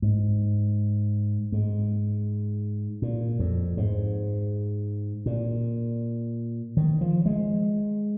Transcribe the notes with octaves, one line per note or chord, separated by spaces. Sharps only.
G#2
G#2
A#2
F2
G#2
A#2
D#3
F3
G#3